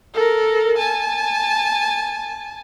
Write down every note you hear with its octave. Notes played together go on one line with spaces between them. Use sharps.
A4 A#4
G#5 A5